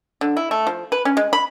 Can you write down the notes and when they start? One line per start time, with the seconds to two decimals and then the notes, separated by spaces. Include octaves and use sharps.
0.21 D3
0.37 E4
0.51 A3
0.67 F3
0.92 B4
1.05 C#4
1.17 G#3
1.33 B5